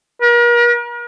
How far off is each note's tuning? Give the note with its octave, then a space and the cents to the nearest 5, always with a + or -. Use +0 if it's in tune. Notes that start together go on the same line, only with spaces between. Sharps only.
A#4 +40